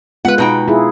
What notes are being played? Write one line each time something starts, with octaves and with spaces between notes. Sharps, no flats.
G#3 B3 F4 B4 F#5
B2 D#4 B4 G5
E4 F4 G#4